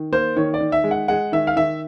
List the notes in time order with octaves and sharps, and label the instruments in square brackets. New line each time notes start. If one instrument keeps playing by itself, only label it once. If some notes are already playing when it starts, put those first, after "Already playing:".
Already playing: [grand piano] D#3
A#3 C5
D#3 C#5
D5
D#3
E5
G#3
F#5
G#3 F#5
D#3 E5
F5
D#3 E5